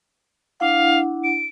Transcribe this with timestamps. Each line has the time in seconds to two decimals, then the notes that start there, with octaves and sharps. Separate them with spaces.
0.60 D4 E4 F5 F#5
1.24 D7